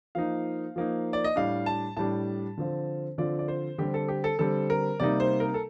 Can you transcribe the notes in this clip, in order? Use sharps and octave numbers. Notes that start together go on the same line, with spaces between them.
F3 A#3 D#4 F5
F3 A#3 D#4
D5
D#5
A2 G3 D4 F5
A5
A2 G3 D4 A5
D3 F3 C4 F4
D3 F3 C4 F4 D5
D5
C5
D3 G3 C4 G4
A4
G4
A4
D3 G3 C4 A4
A#4
C3 G3 A#3 D#4 D5
C5
A#4
A4